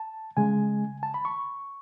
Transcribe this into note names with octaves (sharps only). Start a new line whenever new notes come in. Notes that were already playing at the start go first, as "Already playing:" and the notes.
Already playing: A5
C#3 G#3 G#5
A5
B5
C#6